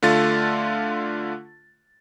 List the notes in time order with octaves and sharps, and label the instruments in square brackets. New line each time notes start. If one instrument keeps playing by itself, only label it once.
[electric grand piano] D3 A3 F4 A6